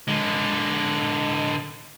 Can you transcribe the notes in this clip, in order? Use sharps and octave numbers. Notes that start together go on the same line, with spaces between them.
D3 G#3